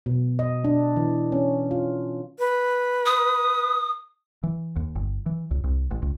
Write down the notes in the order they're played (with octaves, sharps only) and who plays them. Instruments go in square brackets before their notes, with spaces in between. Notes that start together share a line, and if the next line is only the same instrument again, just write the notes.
[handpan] B2
D#5
D4
E3
C#4
F4
[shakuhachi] B4
[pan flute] D#6
[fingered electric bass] E3
D#2
G1
E3
C#2
C2
A1
C#2